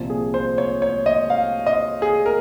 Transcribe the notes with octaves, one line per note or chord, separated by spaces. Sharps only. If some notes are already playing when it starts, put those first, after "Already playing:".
Already playing: C2 A#2 F3
G#4
C5
C#5
C#5
D#5
F5
D#5
G#4
A#4